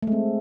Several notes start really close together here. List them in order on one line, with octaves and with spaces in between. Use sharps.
A3 G#3 C4